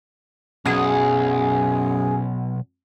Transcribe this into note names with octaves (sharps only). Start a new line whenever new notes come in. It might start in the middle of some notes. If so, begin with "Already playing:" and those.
B1 F#2 B2 G#4 F#5